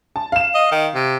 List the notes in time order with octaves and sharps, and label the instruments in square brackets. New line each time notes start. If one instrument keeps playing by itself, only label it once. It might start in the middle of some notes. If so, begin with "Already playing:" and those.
[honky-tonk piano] A5
F5 E7
[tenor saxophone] D#5
D#3
C3